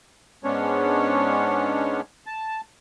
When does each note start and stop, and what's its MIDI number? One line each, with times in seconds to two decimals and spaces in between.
0.44 2.01 44
0.44 2.01 56
0.44 2.01 59
0.44 2.01 61
0.44 2.01 62
0.44 2.01 73
2.26 2.61 81